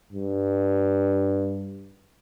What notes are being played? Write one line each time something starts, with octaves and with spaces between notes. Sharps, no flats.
G2